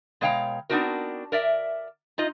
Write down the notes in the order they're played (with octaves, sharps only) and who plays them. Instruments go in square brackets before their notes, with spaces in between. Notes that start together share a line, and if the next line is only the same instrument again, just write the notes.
[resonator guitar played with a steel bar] B2 G#3 C#5 F5 G5 A#5
B3 C4 D4 D#4 F#4 A#4
A#4 D5 E5
D#4 F4 D#5